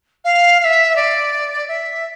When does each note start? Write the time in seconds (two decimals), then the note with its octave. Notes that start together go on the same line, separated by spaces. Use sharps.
0.24 F5
0.60 F5
0.64 E5
0.96 D5
1.68 E5